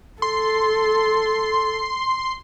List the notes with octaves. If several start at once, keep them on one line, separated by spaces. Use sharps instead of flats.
A4 C6